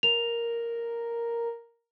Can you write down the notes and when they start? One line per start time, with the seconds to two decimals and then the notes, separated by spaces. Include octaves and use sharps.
0.03 A#4 F7